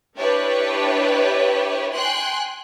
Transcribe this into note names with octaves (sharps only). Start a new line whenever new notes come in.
D4 E4 G4 B4 C#5
G5 G#5 C6 F#6